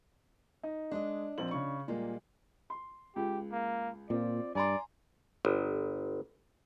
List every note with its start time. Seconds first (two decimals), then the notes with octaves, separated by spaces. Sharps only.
0.63 D#4
0.91 G#3 D4 D#5
1.38 A#1 C4 F#7
1.51 C#3 C#6
1.88 A#2 G3 G#3 A#3
2.70 C6
3.16 C#2 G4
3.52 A#3
4.10 A#2 C4 F4 D5
4.55 G2 D5 G#5 A#5 C6
5.45 G1